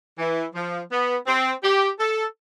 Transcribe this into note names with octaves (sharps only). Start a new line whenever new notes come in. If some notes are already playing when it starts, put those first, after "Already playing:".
E3
F3
B3
C4
G4
A4